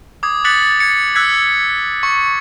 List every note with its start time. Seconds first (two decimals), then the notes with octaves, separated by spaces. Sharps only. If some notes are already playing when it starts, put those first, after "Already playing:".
0.23 D6 D#6 G#6
0.44 D6 F#6 A6 B6 C#7 F#7
0.80 G#6 C#7
1.15 E6 F#6 G#6 B6
2.03 C#6 C#7